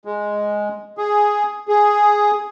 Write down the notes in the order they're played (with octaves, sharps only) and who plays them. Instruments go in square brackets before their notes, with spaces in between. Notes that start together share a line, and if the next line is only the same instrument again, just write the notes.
[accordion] G#3
G#4
G#4